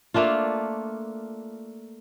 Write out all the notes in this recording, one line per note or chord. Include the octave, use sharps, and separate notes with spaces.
A3 A#3 D4 F4